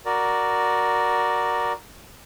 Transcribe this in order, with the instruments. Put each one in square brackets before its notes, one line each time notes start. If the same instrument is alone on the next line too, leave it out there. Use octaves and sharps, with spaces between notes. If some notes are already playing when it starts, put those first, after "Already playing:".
[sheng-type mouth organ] F#4 A#4 D5